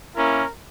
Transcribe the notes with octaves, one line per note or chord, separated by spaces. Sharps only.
A#3 C#4 E4 A#4